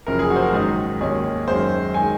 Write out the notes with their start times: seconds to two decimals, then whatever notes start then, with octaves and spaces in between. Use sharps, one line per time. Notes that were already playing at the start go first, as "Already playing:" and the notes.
0.07 F#1 F#2 F3 A#4
0.19 G#4
0.30 F#4
0.36 C5
0.42 A#4
0.53 G#2 D#3 F#3 G#4
1.01 D#2 D#3 G#3 C#4 G#4
1.48 F#2 D#3 G#3 C#4 C5
1.94 D#3 G#3 G#5